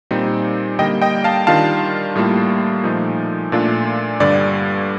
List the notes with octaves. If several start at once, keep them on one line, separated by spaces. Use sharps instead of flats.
A#2 G3 C4 D#4
D3 G3 A#3 D#5 G5
D#5 G5
F5 A5
D#3 G3 D4 F4 F5 A5
A2 G3 A#3 F4
A#2 F3 A3 D#4
A#2 A3 D4 F4
G2 D3 G3 D5